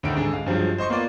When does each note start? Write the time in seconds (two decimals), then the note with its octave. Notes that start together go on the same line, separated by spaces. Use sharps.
0.03 D2 A2 D#3 D7
0.16 G#2 D3 G#3
0.32 C#2 F5
0.46 G2 F3 F#3 G#3
0.78 C5 D#5 C6 C#6
0.90 A#3 B3 F4 D5